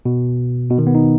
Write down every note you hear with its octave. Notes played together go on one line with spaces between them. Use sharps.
B2
B2
D#3
B3
D#4